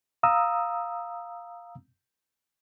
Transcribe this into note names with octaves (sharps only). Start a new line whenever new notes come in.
F5 A#5 D#6 E6